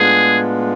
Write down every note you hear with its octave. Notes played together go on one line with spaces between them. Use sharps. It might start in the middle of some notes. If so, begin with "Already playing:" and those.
Already playing: A2 G#3 B3 D4 F4 G#4